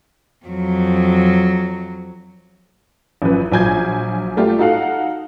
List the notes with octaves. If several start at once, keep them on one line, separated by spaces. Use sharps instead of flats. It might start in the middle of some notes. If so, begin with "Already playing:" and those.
F2 F#3
A1 F#2 F3 B4
A#1 F#3 F4 G#5 G6 G#6
G3 A3 F4 G4
D#4 F#4 A4 F5 F#5